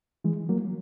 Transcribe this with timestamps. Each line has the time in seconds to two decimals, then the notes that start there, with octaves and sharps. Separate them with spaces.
0.24 E3 G#3
0.49 F#3 A#3